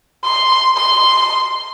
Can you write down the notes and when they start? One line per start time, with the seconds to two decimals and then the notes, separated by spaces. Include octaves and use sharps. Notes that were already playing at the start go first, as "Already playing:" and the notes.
0.24 C6
0.76 C6